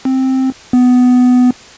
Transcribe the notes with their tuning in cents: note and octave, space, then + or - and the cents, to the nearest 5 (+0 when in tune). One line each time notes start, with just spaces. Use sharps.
C4 +5
B3 +15